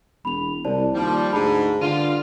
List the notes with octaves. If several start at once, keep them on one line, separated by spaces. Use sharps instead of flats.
E1 B5 F7
C2 C5 D5 A5
D#2 F3 G3
D2 G#2 G#4 A5 B5
G2 D3 F4 D#7